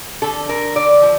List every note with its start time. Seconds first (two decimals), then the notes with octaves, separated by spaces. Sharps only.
0.22 D3 A4
0.49 D3 A#4
0.75 D3 D5
1.02 F3